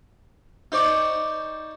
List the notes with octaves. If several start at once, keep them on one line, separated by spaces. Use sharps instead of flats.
D#4 C5 D5 C#6